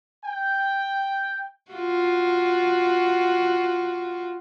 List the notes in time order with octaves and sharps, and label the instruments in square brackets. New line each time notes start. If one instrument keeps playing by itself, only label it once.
[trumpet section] G5
[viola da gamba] F4 F#4